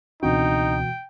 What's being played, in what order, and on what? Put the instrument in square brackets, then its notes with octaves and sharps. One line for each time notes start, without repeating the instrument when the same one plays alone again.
[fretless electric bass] C#2 C4 D4 [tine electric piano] B2 E3 F#4 [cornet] D#4 [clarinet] G5